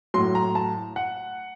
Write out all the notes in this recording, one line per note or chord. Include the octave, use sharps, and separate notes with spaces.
A2 F#3 C6
A#5
A5
F#5